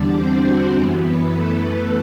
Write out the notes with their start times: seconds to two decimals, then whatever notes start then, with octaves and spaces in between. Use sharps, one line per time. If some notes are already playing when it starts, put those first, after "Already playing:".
Already playing: E2 D3 G3 D4 D5
0.15 C4 C5
0.45 F#4
0.74 F#2 E3 G3 B3 G4
1.03 B3 B4
1.33 A3 A4
1.62 B3 B4